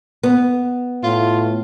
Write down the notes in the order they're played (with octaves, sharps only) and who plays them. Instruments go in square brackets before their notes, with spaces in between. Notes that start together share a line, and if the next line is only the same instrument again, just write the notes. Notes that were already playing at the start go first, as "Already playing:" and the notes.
[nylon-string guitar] B3
[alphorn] A2 [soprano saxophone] F4